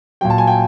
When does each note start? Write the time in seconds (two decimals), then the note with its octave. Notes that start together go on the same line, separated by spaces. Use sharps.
0.21 A#2 F#3 G5
0.30 A5
0.38 G#5
0.47 G5